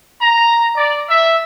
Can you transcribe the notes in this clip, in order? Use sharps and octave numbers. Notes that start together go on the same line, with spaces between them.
A#5
D5
E5